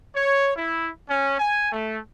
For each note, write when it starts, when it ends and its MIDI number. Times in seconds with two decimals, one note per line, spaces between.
0.15 0.52 73
0.56 0.88 64
1.09 1.39 61
1.39 1.72 80
1.72 1.98 57